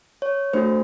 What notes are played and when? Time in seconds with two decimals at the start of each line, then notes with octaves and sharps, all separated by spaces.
0.22 C#5
0.53 A3 D4 F#4 A4 C5